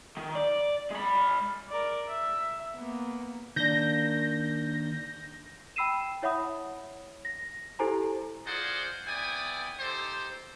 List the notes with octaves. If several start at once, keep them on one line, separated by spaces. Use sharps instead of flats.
D#3
D5
G#3 B5
A#4 D5
E5
A#3 B3
D#3 A#3 D4 G6 A#6
G5 B5 E6 C7 D#7 E7
E4 C#5 E5 F#5 B5 D#6
A#6
E4 G4 A4 C5 G#5 A#5
F4 G#4 C5 D5 D#5 F#5
B3 E4 D5 G5 G#5 D#6
D#4 G4 A4 C5